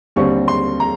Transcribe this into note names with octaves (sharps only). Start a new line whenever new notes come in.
D#2 D3 G3 C4 C#6
C6
A#5